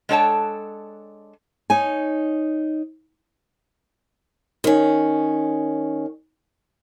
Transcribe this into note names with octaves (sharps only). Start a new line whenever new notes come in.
G#3 D4 A4 C#5 G5 A5
D#4 C#5 G#5
D#3 C#4